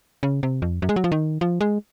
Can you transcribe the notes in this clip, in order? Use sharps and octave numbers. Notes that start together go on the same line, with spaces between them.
C#3
C3
F2
F#2
G#3
F#3
F3
D#3
F3
G#3